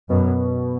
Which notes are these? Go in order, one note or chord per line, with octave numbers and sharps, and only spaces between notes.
F#2 B2